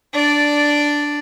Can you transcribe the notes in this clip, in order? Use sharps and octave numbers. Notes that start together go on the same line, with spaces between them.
D4 D5